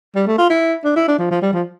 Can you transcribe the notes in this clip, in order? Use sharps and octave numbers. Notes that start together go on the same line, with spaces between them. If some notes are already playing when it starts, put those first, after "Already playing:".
G3
A3
F4
E4
D4
E4
D4
F3
F3
G3
F3